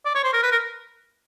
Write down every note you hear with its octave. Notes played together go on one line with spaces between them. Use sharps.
D5
C#5
C5
A#4
B4
A#4